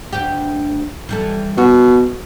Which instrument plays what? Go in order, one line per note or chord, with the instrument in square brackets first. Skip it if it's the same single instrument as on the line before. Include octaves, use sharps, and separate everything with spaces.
[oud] D2 G4
E3 G3 A4
[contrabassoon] B2 [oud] F#4